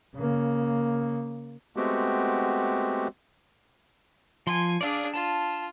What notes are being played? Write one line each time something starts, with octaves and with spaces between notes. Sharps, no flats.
C#3 A#3
G#3 A3 B3 C4 F#4 G4
F3 G#5 C6
D4 G#4 D5 F5 E6
F4 A5